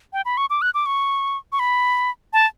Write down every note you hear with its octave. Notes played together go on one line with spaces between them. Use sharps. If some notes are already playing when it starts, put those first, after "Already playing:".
G5
B5
C#6
D6
F#6
D6
C#6
C#6
B5
A5